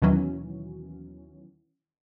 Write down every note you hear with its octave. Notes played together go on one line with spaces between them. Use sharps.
D#2 B2 D#3 E3 F#3 C#4